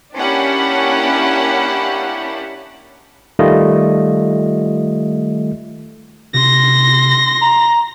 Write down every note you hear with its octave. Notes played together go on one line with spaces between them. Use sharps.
A#3 C#4 D4 E4 G4 F#5
D#3 G3 A3 F4 D#5
C3 C6 A#6
A#5